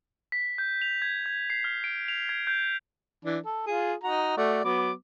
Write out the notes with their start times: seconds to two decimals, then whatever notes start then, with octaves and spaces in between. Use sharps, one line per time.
0.32 B6
0.58 G6
0.82 F7
1.02 G#6
1.26 G#6
1.50 C7
1.64 F6
1.84 D7
2.08 F7
2.29 G#6
2.47 G6
3.25 E3 D4
3.46 A4
3.67 F4 G#4
4.03 D#4 F#4 A#5
4.37 A3 F#4 D5
4.65 F#3 B3 D6